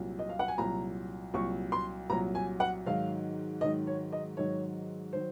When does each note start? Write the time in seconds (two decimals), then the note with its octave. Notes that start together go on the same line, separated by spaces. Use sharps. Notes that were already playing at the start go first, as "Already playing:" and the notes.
Already playing: C2 A#2 F#3
0.19 D#5
0.29 F5
0.39 F#5
0.48 G#5
0.58 C2 A#2 F#3 A#5
1.34 C2 A#2 F#3 C#6
1.72 C6
2.10 C2 A#2 F#3 A#5
2.35 G#5
2.60 F#5
2.86 G#2 D#3 F#3 F5
3.61 G#2 D#3 F#3 D#5
3.87 C#5
4.13 D#5
4.37 G#2 D#3 F#3 C#5
5.13 D#3 F#3 C5